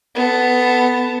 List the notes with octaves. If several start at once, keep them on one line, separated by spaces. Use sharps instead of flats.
B3 A4